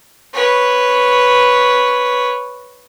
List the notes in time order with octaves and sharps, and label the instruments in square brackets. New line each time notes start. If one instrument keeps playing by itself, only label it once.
[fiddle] B4 C#5